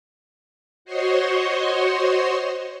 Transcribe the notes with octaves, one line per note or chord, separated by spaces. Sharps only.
F#4 C5 C#5 D#5 C6 C#6